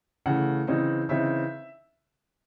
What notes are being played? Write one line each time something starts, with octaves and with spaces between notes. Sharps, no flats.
C#3 E3 A3 F#5
C#3 E3 C4 D#4
C#3 E3 C4 D#4 E5